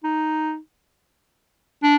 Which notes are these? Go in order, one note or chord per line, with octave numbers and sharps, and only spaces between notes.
D#4
D4